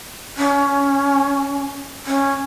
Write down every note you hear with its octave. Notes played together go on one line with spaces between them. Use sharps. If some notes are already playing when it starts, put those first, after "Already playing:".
C#4
C#4